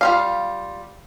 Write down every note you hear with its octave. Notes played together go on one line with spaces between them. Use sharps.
G3 F4 F5